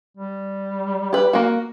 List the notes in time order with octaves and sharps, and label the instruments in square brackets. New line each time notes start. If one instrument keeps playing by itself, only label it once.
[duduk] G3
[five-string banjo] G4 B4
A#3 F#4